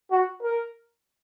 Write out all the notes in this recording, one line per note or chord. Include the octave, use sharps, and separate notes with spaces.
F#4
A#4